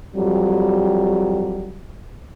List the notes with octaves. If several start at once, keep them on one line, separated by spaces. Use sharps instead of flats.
F2 F#3 G3